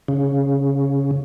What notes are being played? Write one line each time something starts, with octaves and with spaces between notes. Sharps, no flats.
C#3